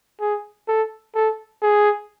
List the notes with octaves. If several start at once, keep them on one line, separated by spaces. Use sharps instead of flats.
G#4
A4
A4
G#4